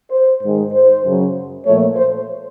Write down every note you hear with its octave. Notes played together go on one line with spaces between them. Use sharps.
C5
G#2 D#3 G#3
C5
F#2 C#3 F#3
A#2 F3 A3 C#5
C5